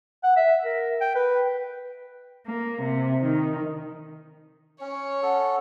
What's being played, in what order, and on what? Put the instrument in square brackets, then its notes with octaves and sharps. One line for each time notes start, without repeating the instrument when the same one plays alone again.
[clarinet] F#5
E5
A#4
G5
B4
[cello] A#3
C3
D#3
[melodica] C#4 [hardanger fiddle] C#5
[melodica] C#4 A4 [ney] F#5